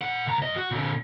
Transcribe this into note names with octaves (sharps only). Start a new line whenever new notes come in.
A#2 F#5
C2 A#5
F#2 D#5
F#4
A#2 D3